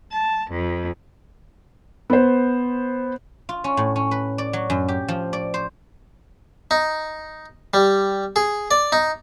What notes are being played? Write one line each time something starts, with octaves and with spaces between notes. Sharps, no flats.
A5
F2
B3 C5
F4
C#4
A2
C#4
B4
D5
F#3
F#2
G4
F3
D5
C5
D#4
G3
G#4
D5
D#4